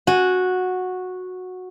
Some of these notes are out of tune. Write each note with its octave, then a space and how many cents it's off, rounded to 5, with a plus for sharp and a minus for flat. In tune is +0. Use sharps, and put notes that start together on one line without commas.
F#4 -10 G#5 +0